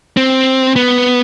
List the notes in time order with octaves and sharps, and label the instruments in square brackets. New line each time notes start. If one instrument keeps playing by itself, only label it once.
[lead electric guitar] C4
B3